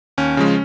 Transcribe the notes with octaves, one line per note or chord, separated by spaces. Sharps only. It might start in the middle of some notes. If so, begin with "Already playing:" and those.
D#2 C#4
C#3 F3 G#3